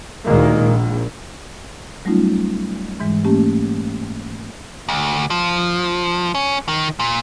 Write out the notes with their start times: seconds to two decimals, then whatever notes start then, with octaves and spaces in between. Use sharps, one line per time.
0.25 D2 A#2 D#3 G#3 A#3
0.63 A#1
2.05 F#3 G3 A3 C#4 D#4 F4
3.00 G#2 E3 G#3
3.24 A3 A#3 C#4 G4
4.89 D2
5.30 F3
6.35 C#4
6.68 D#3
7.00 A#2